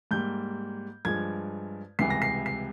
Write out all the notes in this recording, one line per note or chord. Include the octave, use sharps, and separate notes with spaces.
G#2 G3 A#3 G6
G2 F3 G#3 G#6
C#2 C3 E3 G3 C7
A#6
C7
C7